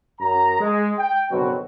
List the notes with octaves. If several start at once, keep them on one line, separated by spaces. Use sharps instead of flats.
F#2 A#5
G#3
G5
F#1 B2 D3 F#3 C4 F#4